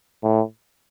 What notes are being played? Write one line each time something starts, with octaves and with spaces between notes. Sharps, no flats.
A2